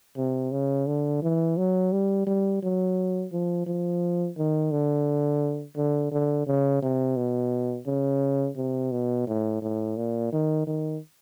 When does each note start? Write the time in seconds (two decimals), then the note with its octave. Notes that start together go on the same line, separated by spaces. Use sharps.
0.17 C3
0.52 C#3
0.87 D3
1.22 E3
1.57 F#3
1.92 G3
2.27 G3
2.62 F#3
3.32 F3
3.66 F3
4.37 D#3
4.72 D3
5.76 D3
6.11 D3
6.47 C#3
6.82 C3
7.17 B2
7.86 C#3
8.57 C3
8.92 B2
9.27 A2
9.62 A2
9.97 A#2
10.32 D#3
10.67 D#3